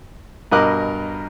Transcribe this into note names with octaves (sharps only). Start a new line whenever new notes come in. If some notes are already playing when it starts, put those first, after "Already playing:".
G2 B2 A#4 D#5 D6 F#6